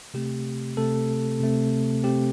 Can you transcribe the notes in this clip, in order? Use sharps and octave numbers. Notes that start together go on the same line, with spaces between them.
C3 A3 C4 G4
C3 A3 C4 A4
C3 A3 C4
C3 A3 C4 G4